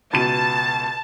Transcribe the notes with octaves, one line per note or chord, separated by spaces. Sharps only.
C#2 B2 A5 D#7